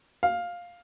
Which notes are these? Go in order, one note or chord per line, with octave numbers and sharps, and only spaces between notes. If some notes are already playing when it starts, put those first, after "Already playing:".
F5